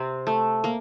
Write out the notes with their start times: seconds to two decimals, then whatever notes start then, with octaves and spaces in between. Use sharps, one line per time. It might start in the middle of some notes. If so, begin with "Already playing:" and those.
Already playing: C3 C4
0.27 A3
0.64 A#3